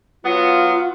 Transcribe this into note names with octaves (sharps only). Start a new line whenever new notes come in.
F#3 B3 F4